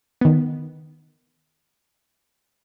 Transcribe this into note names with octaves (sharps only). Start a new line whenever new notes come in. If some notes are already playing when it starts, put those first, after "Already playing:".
D#3 B3